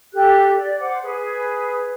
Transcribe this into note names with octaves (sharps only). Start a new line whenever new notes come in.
G4 A4 F#6
D5
C5 F#5 D6
G#4 B4